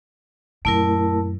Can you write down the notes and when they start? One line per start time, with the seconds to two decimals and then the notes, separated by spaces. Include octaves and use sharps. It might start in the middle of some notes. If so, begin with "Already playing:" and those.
0.65 F#2 A#2 A3 E4 A#4